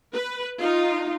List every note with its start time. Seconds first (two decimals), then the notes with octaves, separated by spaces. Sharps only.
0.14 B4
0.59 D#4 F4